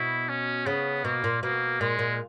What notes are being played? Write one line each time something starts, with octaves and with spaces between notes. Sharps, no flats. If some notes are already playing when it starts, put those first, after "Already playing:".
Already playing: B2 E4
C#4
C#3 B3
B2 A#3
A#2
B2 A#3
A#2 G#3
A#2